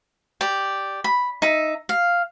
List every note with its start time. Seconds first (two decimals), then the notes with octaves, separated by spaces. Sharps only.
0.41 G4 D5
1.04 B5
1.42 D#4 E5
1.89 F5